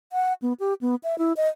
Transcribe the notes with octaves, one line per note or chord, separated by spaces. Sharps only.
F#5
B3
G4
B3
E5
E4
D#5